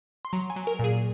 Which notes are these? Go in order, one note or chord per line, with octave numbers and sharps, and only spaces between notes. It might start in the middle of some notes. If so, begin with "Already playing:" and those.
C6
F#3 A#5
G#5
F#3
A#4
A#2 G#4